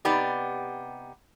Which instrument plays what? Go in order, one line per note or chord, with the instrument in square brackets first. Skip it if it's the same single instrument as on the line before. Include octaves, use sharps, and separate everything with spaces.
[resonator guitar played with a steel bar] C3 B3 D#4 G4 D5